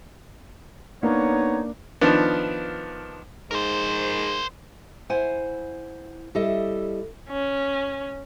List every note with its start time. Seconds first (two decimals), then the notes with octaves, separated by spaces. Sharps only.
1.03 A#3 B3 D4 D#4 C#5
2.01 D#3 F3 B3 D4
3.51 G#2 A#4 C5
5.09 E4 C5 F#5 G#5
6.35 G3 E4 A4 D#5
7.29 C#4